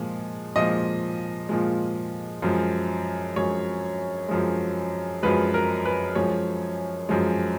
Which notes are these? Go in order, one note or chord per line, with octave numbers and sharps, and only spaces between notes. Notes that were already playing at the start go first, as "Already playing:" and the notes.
Already playing: A#2 F3 G#3
A#2 F3 G#3 D#5
A#2 F3 G#3
F#2 F3 G#3
F#2 F3 G#3 C#5
F#2 F3 G#3
F#2 F3 G#3 B4
A#4
B4
F#2 F3 G#3 C#5
F#2 F3 G#3